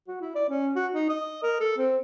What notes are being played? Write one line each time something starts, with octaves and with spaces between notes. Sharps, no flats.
F#4
E4
D5
C#4
F#4
D#4
D#5
A#4
A4
C4